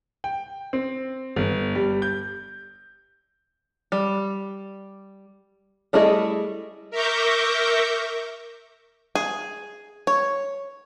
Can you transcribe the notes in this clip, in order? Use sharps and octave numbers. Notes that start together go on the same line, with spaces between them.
G5
C4
G1
G3
G6
G3
G3 A3 E4 G#4 D#5
A#4 E5 A#5 C#6 D6 G6
G#4
C#5